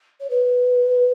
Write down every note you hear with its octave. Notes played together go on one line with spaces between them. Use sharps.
C#5
B4